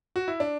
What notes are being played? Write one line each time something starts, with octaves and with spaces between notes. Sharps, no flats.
F#4
E4
D4